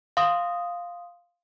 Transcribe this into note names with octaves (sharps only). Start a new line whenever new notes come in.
F5 C6 D#6